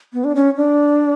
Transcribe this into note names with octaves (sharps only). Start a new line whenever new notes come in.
B3
D4
C#4
D4